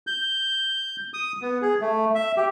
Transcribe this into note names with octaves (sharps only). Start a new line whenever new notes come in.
G6
D#6
B3
G#4
A3
E5
G4